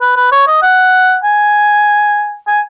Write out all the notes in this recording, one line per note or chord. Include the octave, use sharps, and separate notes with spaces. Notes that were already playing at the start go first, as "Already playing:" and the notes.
B4
B4
C#5
D#5
F#5
G#5
G#5